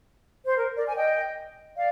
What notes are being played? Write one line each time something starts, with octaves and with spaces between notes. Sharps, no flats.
C5
A#4
A#4 D5
G#5
D#5 G5
D5 F5